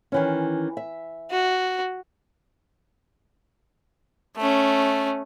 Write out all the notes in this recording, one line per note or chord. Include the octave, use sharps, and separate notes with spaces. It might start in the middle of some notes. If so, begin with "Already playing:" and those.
D#3 E3 C#4
E5
F#4
A3 C#4